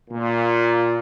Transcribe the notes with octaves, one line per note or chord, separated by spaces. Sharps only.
A#2